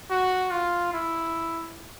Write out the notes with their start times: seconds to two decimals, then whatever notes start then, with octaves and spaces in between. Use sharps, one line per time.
0.10 F#4
0.51 F4
0.93 E4